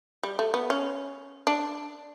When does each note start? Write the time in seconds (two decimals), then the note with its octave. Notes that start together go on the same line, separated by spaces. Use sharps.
0.23 G3
0.39 A3
0.54 B3
0.70 C#4
1.47 D4